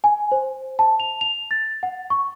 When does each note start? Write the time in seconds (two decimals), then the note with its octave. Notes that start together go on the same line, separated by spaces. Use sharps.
0.04 G#5
0.32 C5
0.79 A5
1.00 F7
1.21 F7
1.51 A6
1.83 F#5
2.10 C#6